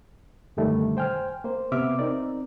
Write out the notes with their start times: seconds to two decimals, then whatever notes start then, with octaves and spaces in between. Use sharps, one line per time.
0.57 F#2 B2 D3 D#3 G3 A3
0.97 C5 G5 G#5 F6
1.44 A#3 C5
1.72 C3 B3 E5 D6 E6 F6
1.99 C4 D#4 A#4 D5